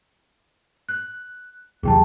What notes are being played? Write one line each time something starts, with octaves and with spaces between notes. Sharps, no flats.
F#6
E2 C3 F#3 G#4 G5 A5